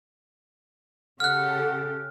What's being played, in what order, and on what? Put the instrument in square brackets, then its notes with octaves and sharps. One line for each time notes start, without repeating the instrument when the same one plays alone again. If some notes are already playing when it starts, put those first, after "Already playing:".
[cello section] C#3 G4 A4 [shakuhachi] F#5 [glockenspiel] F6 F#6